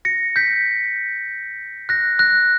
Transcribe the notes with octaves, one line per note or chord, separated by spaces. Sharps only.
A#6 C#7
G6 B6
F#6 A#6
F#6 A#6